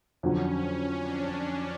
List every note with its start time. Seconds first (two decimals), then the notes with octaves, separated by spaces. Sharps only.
0.23 F2 D3 F#3 C#4
0.96 D4